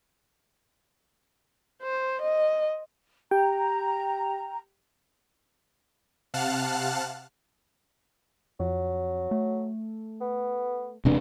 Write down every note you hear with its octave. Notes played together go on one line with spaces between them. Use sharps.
C5
D#5
G4 G5 A#5
C3 F5 F#5 A5 F6 F#6
F2 F#3
A3
B3
E1 G2 C3 D4